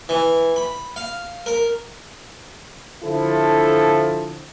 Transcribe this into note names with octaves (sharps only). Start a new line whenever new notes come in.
E3
B5
F5
A#4
D3 F3 E4 A4